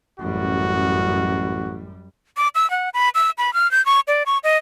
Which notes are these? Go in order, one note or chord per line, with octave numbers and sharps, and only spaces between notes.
A1 F#2 G3 F#4
D6
E6
F#5
B5
E6
B5
F6
G6
C#6
D5
C#6
D#5